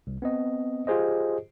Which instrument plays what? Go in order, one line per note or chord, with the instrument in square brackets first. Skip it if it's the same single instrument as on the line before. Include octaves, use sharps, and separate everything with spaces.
[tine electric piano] C2
B3 C4 D#5
F4 G4 G#4 C5 D#5